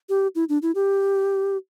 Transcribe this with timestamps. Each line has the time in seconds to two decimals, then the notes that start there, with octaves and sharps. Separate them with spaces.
0.09 G4
0.35 E4
0.49 D4
0.62 E4
0.75 G4